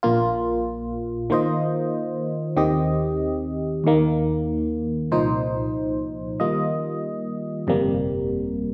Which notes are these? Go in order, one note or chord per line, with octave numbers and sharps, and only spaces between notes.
A#1 A#2 A#3 F4
D#3 A#3 F4 C5 D#5
D#2 D#3 C4 G4 D#5
D#2 D#3 A#3
C2 A#2 F3 D#4 C5
D#3 G3 A#3 F4 D#5
G1 F2 C3 G3 A#3